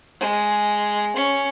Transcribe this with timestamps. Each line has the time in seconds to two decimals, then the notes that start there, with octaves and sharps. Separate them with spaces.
0.20 G#3
1.15 C#4 C#6